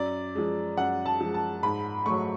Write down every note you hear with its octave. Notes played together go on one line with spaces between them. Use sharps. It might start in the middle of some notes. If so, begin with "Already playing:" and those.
Already playing: F#2 D5
F3 G#3
F#2 F#5
A5
F3 G#3
A5
G#2 B5
F#3 A3 C#6